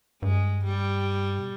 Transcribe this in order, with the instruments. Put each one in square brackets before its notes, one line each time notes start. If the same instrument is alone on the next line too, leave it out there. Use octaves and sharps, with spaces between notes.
[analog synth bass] G2 [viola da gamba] G#3
[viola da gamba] G3
[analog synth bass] B2